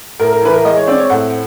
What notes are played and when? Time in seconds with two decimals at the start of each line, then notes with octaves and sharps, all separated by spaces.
0.19 A2 A#4
0.31 A#4
0.41 E3 B4
0.53 A#4
0.64 G#3 D#5
0.77 C#5
0.87 C4 D5
0.98 C#5
1.10 A2 F#5